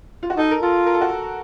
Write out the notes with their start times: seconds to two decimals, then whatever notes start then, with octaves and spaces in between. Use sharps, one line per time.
0.23 F4
0.30 F#4
0.37 D#4 A4
0.51 A#4
0.62 F4 A4
0.86 A#4
0.94 A4
1.01 F#4
1.09 A4